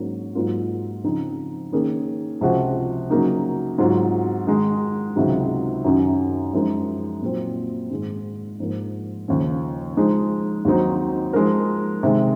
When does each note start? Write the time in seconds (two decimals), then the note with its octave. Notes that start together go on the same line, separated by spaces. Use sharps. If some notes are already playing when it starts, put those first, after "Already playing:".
Already playing: G#2 F#3 A#3 C#4
0.35 G#2 F#3 A#3 F4
1.04 C#3 F3 C4 D#4
1.73 D#3 A#3 C#4 G#4
2.41 C#2 C3 F3 C4 F#4
3.10 C#3 F#3 A#3 D#4
3.78 G#2 F#3 C4 F4
4.47 D#3 G#3 D#4
5.16 C#2 C3 D#3 F#3
5.84 F#2 D#3 F#3 C#4
6.53 F#2 F3 G#3 D#4 A#4
7.22 A#2 F#3 C4
7.91 G#2 D#3 G#3
8.60 G#2 F3 A#3
9.28 D#2 C#3 F3
9.97 F3 G#3 D#4
10.65 D#2 D#3 F#3 C4 D#4
11.33 F3 G#3 D#4 A#4
12.03 C3 D#3 G#3